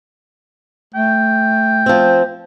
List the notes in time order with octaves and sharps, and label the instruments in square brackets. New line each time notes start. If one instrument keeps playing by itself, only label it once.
[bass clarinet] A3 [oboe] G5
[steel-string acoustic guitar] F3 C4